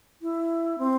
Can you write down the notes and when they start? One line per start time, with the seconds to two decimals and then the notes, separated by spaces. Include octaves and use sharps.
0.22 E4
0.78 C4